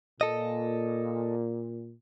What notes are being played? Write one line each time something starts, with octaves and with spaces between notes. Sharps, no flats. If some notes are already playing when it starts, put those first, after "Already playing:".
A#2 A4 D#5